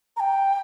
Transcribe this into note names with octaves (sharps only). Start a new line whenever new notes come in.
A#5
G5